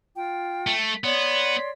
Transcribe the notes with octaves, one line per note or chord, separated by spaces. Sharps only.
F4 G5
A3
B3 C#5 D5 C6